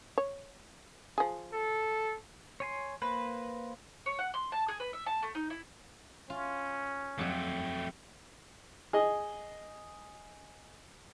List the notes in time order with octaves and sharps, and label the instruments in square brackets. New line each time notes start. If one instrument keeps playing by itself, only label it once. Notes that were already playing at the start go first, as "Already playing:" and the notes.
[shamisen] C#5
F3 G#4
[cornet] A4
[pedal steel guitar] C#5 G#5 C6
[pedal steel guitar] A#3 C5 [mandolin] B4
[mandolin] C#5
F#5
C6
A5
G#4
B4
E5
A5
A3
D#4
E4
[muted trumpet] C#4 [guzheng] F4
[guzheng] F2 F#3 [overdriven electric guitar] A3 G4
[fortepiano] G#4 D#5